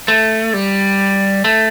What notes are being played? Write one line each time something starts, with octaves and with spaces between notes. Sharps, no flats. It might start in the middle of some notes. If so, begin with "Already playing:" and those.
A3
G3
A3